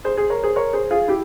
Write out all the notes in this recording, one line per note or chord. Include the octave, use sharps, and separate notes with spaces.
G#4 C5
G#4 C5
A#4 C#5
G#4 C5
A#4 C#5
G#4 C5
F4 G#4
E4 G4